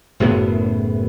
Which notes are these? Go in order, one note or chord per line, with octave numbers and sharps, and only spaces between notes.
F#1 F#2 A2 B3